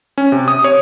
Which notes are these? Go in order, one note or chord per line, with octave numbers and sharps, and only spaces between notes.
C#4
C3
D#6
C#5